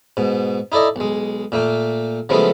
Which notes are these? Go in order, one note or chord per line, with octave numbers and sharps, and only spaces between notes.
G#2 B2
D#4 E4 A4 D5 D#5
B1 G#3
A#2 A3 A#3 G5
C#3 F3 F#3 G#3 A3 B3